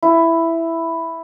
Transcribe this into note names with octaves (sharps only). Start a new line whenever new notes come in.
E4